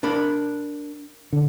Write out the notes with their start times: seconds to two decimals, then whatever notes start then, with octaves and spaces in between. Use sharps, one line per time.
0.03 D4 A#4 B5
1.33 D3